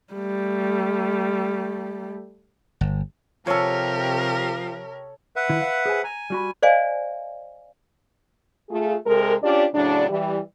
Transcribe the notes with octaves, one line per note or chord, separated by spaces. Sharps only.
G3 A3
G1
C3 F3 G4 A4 A#4 C#5
B4 E5 F#5
D#3 E4
F5
G#4 C5 G#5
G#5 A#5
G3 F#4 B5
C5 D5 D#5 F5 G#5
A3 F4 G#4
C3 G#3 A4 A#4
C#4 D4 F4 G4 D5
A2 C#3 F#3 D4
E3 G3